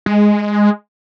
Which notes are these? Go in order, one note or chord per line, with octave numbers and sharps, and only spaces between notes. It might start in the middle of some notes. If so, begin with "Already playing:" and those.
G#3